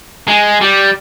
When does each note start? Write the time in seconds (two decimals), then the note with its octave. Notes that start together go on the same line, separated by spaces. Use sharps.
0.28 G#3
0.61 G3